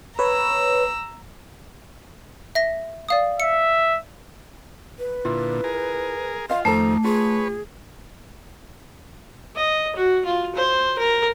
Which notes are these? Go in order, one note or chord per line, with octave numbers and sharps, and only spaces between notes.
B4 C#5 A#5 E6
E5 A#6
D5 F5 D#6
E5 C#7
B4
A#2 D3 E4 F4
G#4 A#4
F4 D#5 F5 C6
F2 D#3 A3 A4 C5 A5 A#5
F4 G#4 B4 C#5
D#5
F#4
F4
C5
A#4